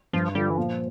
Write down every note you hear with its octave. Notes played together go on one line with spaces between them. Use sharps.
G2 F3
D3 F3 G3
E3
A#2 F3